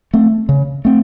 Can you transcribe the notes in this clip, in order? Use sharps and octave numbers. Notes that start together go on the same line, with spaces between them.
A3 C4
C#3
A3 C4